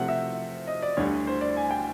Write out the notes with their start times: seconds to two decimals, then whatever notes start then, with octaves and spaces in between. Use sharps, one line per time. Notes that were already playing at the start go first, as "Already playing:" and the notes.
Already playing: C3 F3 A3 C4 F#5
0.08 E5
0.67 D#5
0.82 D5
0.97 D2 D3 G3 C#5
1.27 C5
1.41 D5
1.57 G#5
1.71 G5